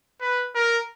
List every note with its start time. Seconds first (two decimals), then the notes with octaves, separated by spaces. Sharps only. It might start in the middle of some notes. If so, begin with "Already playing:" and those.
0.21 B4
0.55 A#4